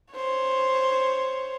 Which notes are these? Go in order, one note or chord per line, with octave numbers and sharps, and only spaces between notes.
C5 C#5